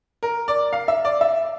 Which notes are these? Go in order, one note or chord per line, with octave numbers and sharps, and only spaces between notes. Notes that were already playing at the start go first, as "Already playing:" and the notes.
A#4
D5
F5
E5
D5
E5